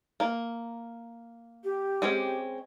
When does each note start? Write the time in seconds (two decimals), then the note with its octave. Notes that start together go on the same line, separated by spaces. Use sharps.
0.20 A#3
1.64 G4
2.02 G#3 C4 C#4